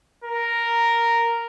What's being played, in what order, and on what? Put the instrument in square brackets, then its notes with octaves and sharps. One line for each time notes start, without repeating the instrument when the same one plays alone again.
[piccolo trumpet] A#4